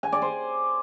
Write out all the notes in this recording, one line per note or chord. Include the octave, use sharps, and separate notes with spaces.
G#5
D5
C5